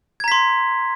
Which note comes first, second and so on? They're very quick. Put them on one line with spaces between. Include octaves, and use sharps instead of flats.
G#6 A#5 B6 C6